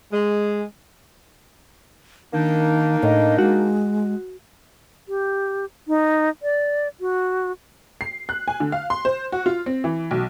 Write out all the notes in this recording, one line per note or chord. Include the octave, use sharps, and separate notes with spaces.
G#3
D#3 A#3 D4 D#4
A2 D#5
G#3 F#4
G4
D#4
D5
F#4
C7
F#6
G#5
D3
F5
C6
C5
F#4
F4
C4
E3
B1